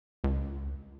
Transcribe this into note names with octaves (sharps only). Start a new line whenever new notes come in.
C#2